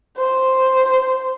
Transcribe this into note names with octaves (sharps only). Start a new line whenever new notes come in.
C5